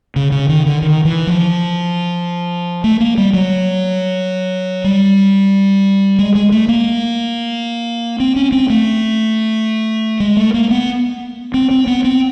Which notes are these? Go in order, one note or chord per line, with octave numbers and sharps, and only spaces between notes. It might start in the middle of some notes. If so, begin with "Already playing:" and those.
C#3
C#3
D#3
D3
D#3
E3
F3
A3
A#3
G3
F#3
G3
G#3
G#3
A3
A#3
C4
C#4
C4
A3
G#3
A3
A#3
B3
C4
C4
B3
C4